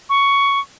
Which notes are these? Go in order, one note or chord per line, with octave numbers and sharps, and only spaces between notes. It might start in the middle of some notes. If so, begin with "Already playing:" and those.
C#6